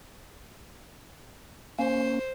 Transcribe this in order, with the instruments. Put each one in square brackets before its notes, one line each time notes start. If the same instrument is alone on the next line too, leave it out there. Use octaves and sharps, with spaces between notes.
[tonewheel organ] A#3 C#4 [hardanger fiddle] C5